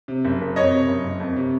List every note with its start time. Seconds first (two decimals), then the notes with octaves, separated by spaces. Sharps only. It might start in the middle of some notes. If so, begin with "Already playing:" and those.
0.08 C3
0.25 F#1
0.41 F#1
0.56 F2 C#5 D#5
0.72 C3
0.88 F#1
1.04 F#1
1.20 F2
1.36 C3